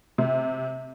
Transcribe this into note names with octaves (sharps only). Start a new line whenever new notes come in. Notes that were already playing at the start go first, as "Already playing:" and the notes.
C3